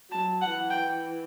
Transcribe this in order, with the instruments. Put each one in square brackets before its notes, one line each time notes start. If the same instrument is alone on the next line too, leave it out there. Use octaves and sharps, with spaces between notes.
[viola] F#3 [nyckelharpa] A5
[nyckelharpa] F#5
[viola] E3
[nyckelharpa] G5